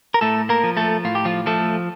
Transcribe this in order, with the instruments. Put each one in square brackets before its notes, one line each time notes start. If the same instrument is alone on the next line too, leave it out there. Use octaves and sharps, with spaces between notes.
[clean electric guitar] A#4
A2 A3 A4
A#3 A#4
F3
A3 A4
A2 F4
G4
F3 F4
F3 A3 A4